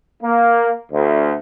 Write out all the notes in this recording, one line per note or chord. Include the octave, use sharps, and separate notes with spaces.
A#3
D2